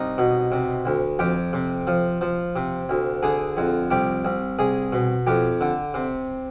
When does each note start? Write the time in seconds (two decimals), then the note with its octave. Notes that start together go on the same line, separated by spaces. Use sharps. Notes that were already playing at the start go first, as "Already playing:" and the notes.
Already playing: C2 D#4
0.18 B2
0.52 C3
0.86 D2
1.19 F2 G4
1.53 C3
1.87 F3
2.21 F3
2.56 C3
2.89 D2
3.23 D3 G#4
3.57 F2
3.90 C2 G4
4.25 C2
4.59 C2 G#4
4.93 B2
5.27 F2 G4
5.61 D3
5.94 C3